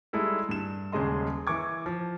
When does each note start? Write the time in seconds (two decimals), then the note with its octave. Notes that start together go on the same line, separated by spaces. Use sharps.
0.13 G3 G#3 D#4 E4 A4
0.49 G2 E7
0.92 D#1 C#3 G#3 D#5 C6
1.47 E3 C#6 D6 G#6
1.86 F3